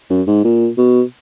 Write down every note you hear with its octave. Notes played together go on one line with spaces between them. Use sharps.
F#2
G#2
A#2
B2